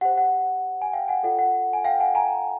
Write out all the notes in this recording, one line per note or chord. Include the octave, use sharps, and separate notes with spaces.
G4 C5 F#5
F#5
G#5
F5 G5
F#5 G#5
F4 A4 D5 F#5
F#5
G#5
F5 G5
F#5 G#5
G#5 A#5